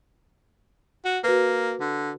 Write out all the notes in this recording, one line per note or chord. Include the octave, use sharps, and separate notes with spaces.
F#4
A#3 F#4 B4
D3